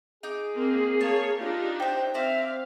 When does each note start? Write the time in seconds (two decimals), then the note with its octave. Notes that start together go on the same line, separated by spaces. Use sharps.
0.23 D#4 G#4 D6
0.55 A#3 C4
1.01 A#3 C#5 A5
1.39 D4 D#4 F4 G4
1.80 C5 E5 G5
2.14 C4 C5 D5 E5 F5 A#5